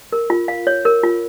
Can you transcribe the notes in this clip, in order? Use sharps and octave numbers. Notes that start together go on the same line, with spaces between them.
A#4
F4
F5
C#5
A#4
F4